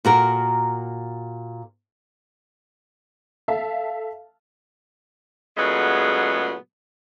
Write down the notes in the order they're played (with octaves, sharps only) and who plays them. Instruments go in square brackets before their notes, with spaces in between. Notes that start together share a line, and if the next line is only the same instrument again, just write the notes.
[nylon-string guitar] A#2 F#4 A#4
[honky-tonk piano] A4 E5 F5 A5
[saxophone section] A#2 C#3 F#3 G#3 A3 B3